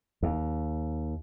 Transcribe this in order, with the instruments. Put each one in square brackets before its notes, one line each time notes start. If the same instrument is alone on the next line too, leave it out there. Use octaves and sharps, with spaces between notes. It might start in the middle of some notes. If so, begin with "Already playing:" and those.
[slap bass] D#2